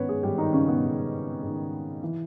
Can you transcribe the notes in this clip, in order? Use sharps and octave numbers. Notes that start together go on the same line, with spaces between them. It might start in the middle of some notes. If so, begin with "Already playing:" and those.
Already playing: G#2 D#3 B3 C#4 B4 C#5
G#3 G#4
G#2 D#3 G3 G4
D#3 D#4
C#3 C#4
B2 B3
G#2 D#3
G#2 D#3
E3